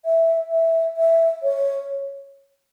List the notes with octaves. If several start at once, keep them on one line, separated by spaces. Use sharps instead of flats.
E5
E5
E5
C#5